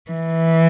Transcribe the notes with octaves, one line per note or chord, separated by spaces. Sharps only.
E3